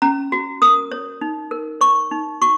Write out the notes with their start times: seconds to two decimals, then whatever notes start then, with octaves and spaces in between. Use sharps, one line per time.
0.02 C#4 A#5
0.32 F#4
0.62 A#4 D#6
0.92 C#5
1.21 D#4
1.51 A#4
1.81 C#5 C#6
2.11 D#4
2.42 F#4 C#6